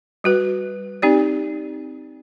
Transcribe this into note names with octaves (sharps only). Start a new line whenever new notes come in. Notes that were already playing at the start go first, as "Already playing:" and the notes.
G3 F#4 B4
C4 D#4 G4 D5